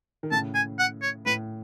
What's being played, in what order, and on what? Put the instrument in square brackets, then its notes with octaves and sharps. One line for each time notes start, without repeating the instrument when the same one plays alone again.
[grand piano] D#3
[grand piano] A2 C#3 [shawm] A5
[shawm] G#5
F#5
C#5
[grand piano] A2 [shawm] B4